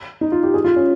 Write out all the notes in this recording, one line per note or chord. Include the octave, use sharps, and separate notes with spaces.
D#4
F4
G4
G#4
F4
C#4